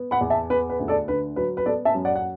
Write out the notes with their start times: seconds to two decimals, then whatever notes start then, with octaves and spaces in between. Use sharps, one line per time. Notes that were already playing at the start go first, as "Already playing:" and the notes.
Already playing: B3
0.11 F#5 B5
0.21 E2
0.30 E5 A5
0.50 B3 B4
0.70 B4
0.80 D2
0.88 A4 D5
1.08 D3 B4
1.36 F#3 B4
1.57 B4
1.66 B3 A4 D5
1.85 E5 A5
1.95 F#2
2.05 D5 F#5
2.16 F#5